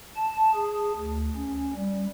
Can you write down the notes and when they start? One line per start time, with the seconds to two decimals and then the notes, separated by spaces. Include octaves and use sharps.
0.16 A5
0.54 G#4
0.96 D2
1.36 C#4
1.76 G3